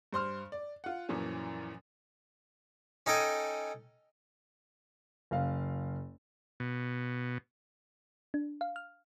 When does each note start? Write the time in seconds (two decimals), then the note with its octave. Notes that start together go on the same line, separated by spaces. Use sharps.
0.13 G2 C5 C6 F6
0.52 D5
0.84 F4 F#5
1.09 F#2 A#2 E3 F3 C#4
3.06 C#4 D#4 A4 D#5 G5 G#5
5.31 F#1 F5
6.60 B2
8.34 D4
8.61 F5
8.76 F6